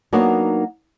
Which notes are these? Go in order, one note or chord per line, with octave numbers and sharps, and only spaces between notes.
F#3 A#3 B3 D4 D#4 F#4